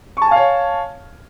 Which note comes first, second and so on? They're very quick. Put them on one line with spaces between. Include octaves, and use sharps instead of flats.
C#6 A5 G#5 F5 C#5